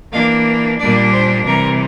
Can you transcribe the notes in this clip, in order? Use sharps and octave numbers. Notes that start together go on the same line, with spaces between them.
E3 A#3 D4 F5
A#2 G3 A#3 D4 D5
C5
C3 E3 G3 A#4